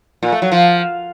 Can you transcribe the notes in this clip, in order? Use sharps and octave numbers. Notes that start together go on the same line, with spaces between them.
A#2
A3
F#3
F3